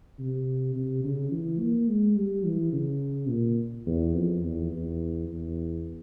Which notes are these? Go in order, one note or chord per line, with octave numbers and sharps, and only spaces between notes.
C3
C3
C#3
E3
A#3
G#3
G3
E3
C#3
A#2
E2
F2
E2
E2
E2